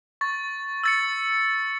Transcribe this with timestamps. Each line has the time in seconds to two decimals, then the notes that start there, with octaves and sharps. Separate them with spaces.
0.21 C#6 A6
0.83 E6 A6 C#7